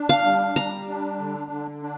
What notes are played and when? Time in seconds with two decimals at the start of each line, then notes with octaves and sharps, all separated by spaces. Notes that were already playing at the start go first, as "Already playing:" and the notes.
Already playing: D4
0.09 F5
0.25 G3
0.56 G3 A#5
0.88 D4
1.19 D3
1.51 D3
1.82 D4